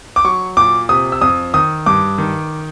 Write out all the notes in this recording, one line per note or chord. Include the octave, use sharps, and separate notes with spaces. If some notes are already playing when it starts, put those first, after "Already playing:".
D6
F#3 C#6
A#2 D6
C3 D#6
E6
F2 D#6
D#3 D#6
G2 D6
D#3